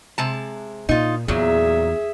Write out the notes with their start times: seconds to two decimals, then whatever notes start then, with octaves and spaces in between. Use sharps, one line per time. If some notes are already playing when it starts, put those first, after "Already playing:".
0.18 C3 G#3 A5
0.89 A#2 D#4 F4
1.28 E2 A#2 F#3 G#4 E5